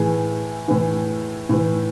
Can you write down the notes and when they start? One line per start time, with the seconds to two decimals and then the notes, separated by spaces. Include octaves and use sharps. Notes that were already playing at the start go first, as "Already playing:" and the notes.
Already playing: A2 E3 G#4
0.68 A2 E3
1.49 A2 E3